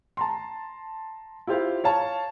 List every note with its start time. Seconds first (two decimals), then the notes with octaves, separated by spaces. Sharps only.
0.17 A5 A#5 C6
1.47 E4 F4 G4 C5 F5
1.84 C#5 F5 A5